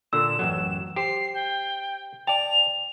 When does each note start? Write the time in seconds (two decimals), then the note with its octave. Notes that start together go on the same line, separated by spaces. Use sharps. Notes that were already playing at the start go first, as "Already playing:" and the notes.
0.13 A#2 D3 E6 E7
0.39 A1 F#2 F#3
0.96 G4 C5 A#5 C7
1.34 G5
2.27 D5 G5 A5 F7